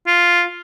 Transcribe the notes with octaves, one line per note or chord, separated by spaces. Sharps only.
F4